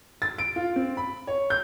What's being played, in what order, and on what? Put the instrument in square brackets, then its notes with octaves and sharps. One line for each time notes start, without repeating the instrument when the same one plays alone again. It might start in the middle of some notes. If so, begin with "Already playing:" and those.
[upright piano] A6
D7
F4
C4
B5
C#5
G6